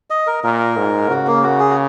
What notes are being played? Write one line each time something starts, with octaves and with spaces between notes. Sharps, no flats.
D#5
A#4
A#2 A#4
G#2
C#3 F#4
A#3
F#4
G#4
F#4